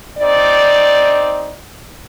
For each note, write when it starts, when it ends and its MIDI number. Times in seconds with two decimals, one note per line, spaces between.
0.18 1.57 60
0.18 1.57 63
0.18 1.57 74